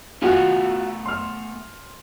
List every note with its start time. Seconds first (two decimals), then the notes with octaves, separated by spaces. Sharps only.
0.22 A3 B3 F4 F#4 F#5 G#5
1.06 C6 F6